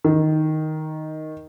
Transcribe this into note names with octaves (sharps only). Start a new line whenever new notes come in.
D#3